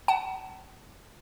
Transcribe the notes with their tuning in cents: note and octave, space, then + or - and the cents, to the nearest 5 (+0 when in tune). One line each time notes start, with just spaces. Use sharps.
F#5 +40 A5 +0